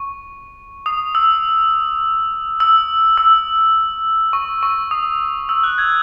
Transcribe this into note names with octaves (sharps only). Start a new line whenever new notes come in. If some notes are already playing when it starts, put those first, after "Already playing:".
Already playing: C#6
D#6
E6
E6
E6
C#6
C#6
D#6
E6
F#6
G#6